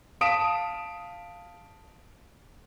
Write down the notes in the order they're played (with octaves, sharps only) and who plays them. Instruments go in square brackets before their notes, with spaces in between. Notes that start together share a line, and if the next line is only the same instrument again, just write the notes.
[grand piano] F5 A5 D#6 B6 D7 E7